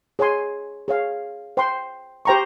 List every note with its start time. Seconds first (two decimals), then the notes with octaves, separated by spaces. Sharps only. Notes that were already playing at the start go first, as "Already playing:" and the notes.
0.19 G#4 C#5 G#5 C6
0.88 G#4 C#5 F5
1.57 C5 G5 C6
2.25 G4 C5 G5 A#5 C#6